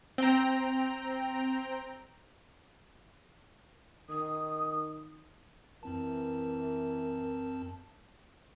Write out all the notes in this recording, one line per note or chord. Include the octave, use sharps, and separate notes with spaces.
C4 G5 A#5
D#3 D#6
F#2 E3 C4 A#4 A5